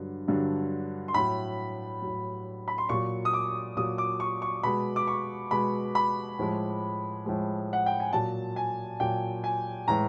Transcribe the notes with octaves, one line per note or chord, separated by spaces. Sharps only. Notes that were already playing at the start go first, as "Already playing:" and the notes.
Already playing: G2 D3 F#3
G2 D3 F#3
C6
A2 F#3 B5
A2 F#3
B5
C6
A#2 F#3 C#6
D#6
D6
A#2 F#3 D#6
D6
C#6
C#6
B2 G#3 B5
D6
C#6
B2 G#3 B5
B5
A2 F3 G#3
A2 F3 G#3
F#5
G5
G#5
A#2 F#3 A5
G#5
A#2 F#3 G5
G#5
A2 E3 G#3 A#5